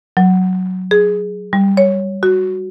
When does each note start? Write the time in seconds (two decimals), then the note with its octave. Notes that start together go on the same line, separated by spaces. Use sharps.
0.17 F#3
0.91 G#4
1.53 G3
1.77 C#5
2.23 F#4